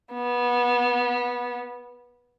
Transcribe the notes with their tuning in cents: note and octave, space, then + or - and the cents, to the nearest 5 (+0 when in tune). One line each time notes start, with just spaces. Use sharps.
B3 -20